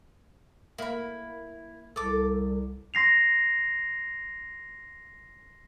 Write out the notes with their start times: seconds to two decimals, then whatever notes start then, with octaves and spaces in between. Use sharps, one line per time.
0.78 A#3 E4 B5
1.96 C2 A4 D6 E6
2.94 C6 A#6 C7 F7